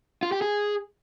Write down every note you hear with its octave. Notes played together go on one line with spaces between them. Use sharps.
F4
G4
G#4